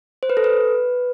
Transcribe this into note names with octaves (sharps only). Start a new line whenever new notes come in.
C5
B4
A4
B4